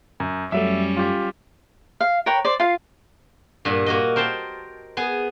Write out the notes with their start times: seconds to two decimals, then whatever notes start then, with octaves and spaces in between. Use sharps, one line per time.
0.20 F#2
0.52 F#2 F#3 G3 A3 C#4 E5
0.97 F4 G4
2.00 F5
2.26 A#4 B4 C#5 G5
2.45 C5 D5
2.60 F4 F5
3.65 G2 A#2 F#5
3.86 A#3 F#4 D#5
4.16 A#4 C5 G5 A5
4.97 B3 G#4 G#5